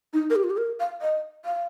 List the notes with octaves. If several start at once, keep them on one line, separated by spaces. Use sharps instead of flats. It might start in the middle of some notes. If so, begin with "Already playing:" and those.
D#4
A#4
G4
F4
G4
A#4
F5
D#5
F5